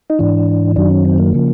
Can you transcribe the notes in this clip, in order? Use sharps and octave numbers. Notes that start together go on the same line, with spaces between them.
D#4
G#2 E3 D4
F#2 D#3 F#3 D4
C#4
C4
A#3
C#3 F3